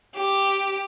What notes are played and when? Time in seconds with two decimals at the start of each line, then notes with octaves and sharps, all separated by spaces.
0.16 G4